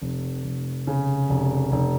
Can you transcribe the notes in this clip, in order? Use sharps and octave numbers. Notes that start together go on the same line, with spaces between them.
F1
F1
C#3
F1
F1